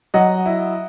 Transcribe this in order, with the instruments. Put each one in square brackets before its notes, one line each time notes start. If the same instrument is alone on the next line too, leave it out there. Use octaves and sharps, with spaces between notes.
[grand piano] F#3 [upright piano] D#5 F#5
[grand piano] E4